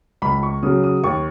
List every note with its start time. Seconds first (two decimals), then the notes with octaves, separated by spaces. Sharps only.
0.22 C#2 B5
0.34 B5
0.43 C#6
0.63 C#3 F#3 D#6
0.84 D#6
1.03 D#2 C#6